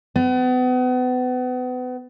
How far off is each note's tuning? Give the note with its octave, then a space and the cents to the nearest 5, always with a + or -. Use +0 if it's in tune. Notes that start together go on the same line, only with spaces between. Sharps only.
B3 +35